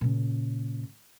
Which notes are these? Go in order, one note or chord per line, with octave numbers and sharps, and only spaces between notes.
A#2 C#3